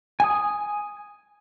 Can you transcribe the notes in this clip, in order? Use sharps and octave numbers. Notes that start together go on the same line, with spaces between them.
G#5 D#6